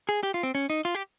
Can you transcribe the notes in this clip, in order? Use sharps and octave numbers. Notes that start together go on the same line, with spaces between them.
G#4
G4
F4
C4
C#4
D#4
F4
G4